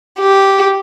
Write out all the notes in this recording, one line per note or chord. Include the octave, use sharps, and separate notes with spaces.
G4